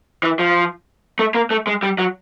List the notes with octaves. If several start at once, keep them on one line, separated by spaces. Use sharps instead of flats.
E3
F3
A3
A#3
A3
G#3
G3
F#3